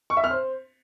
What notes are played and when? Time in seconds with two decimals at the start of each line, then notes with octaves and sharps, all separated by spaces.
0.10 C#6
0.17 E5
0.24 F6
0.31 C5